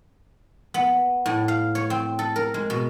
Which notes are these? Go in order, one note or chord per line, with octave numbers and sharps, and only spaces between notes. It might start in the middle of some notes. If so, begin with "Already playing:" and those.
B3
A2
F5
C#5
C4
A4
A#4
G#3
B2